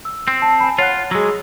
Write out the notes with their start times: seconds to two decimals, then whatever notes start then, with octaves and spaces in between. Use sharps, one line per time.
0.05 E6
0.28 C4
0.42 A5
0.60 G#5 B5
0.79 F4 C#5 F#5 F#6
1.11 F#3 G#3 G#4 E6